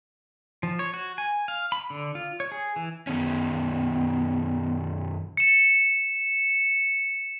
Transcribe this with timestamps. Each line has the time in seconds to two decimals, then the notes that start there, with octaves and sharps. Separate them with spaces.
0.63 F3
0.79 C#5
0.94 F#4
1.18 G#5
1.48 F5
1.72 B5
1.90 D3
2.15 F4
2.40 C#5
2.52 G#4
2.76 E3
3.07 F#2 D#3 B3 C#4
5.37 C#7 E7